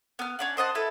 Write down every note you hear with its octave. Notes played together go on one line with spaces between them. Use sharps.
B3 F6
C#4 D4 F#5
C5 D#5 F#5 A5
E4 A4 B4